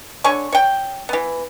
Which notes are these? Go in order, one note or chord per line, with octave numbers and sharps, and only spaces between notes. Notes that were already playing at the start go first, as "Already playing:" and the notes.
D3 C#5 G#5 C#6
C#5 G5
E3 B3